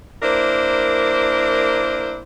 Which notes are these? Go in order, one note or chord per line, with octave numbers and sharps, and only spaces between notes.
A#3 D4 E4 A#4 C5